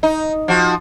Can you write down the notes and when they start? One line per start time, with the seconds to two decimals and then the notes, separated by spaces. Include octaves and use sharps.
0.03 D#4
0.48 F3 F#4